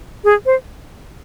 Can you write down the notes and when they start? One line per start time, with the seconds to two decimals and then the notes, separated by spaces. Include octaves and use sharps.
0.24 G#4
0.46 C5